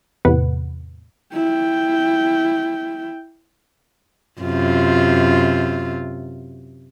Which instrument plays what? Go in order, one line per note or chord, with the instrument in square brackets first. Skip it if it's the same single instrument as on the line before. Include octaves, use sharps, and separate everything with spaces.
[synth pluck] E2 A2 C3 B4 F#5
[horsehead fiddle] E4 G5
[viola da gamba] F#2 C3 F4